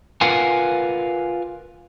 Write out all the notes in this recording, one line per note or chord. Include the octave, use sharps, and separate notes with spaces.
F4 A#4 B4 F5 F#5 G#5